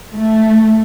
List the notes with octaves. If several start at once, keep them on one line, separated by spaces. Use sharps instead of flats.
A3